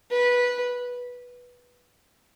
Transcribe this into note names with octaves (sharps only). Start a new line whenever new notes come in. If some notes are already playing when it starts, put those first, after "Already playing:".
B4